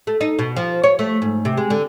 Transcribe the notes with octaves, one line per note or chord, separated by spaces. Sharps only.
A3
D#4
B2
F3
C#5
A3
G#2
C3
G#3
D3